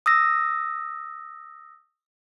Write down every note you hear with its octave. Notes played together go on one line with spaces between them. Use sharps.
D#6 E6 A#6